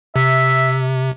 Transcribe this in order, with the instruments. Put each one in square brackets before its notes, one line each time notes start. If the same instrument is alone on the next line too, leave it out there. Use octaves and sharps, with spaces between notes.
[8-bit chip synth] C3 [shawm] E5